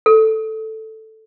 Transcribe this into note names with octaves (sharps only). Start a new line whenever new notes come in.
A4